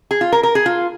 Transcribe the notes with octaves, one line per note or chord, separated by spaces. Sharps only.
G#4
F4
A#4
A#4
G#4
F4